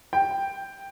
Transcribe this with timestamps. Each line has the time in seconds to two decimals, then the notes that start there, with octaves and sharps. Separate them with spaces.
0.13 G5